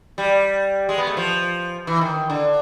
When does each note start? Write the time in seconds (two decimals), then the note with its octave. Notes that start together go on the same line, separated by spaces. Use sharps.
0.18 G3
0.89 G#3
0.98 B3
1.07 A3
1.17 F3
1.87 E3
2.01 D#3
2.30 D3